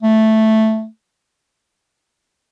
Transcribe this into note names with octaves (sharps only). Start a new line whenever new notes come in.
A3